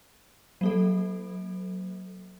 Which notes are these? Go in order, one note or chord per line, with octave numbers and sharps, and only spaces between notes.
F#3 A#3 A4